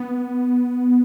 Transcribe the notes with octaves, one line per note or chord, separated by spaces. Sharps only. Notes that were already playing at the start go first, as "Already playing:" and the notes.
Already playing: B3